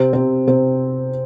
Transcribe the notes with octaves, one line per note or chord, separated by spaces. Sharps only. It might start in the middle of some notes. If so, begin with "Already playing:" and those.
Already playing: C3 C4
C3 C4
C3 C4